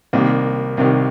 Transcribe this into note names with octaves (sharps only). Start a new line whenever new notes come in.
C2 C3 D#3 A#3
C2 C3 D#3